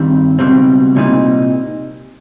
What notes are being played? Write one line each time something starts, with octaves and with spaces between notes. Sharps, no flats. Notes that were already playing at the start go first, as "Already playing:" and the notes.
Already playing: G2 D#3 G3 C4
C#2 B2 G3 C4
C2 A#2 G3 C4 D#4